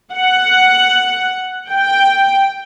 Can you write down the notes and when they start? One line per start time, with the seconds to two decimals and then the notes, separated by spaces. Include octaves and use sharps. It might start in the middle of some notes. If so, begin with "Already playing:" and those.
0.14 F#5
1.70 G5